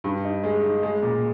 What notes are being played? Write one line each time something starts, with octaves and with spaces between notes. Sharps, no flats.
G2
D#4
G#3
D#4
G#3
A#2